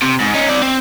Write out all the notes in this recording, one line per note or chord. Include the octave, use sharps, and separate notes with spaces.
C3
G#2
C#4 D#4
C4 D5
C4